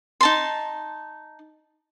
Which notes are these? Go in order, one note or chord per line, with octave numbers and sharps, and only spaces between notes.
D#4 A5 C6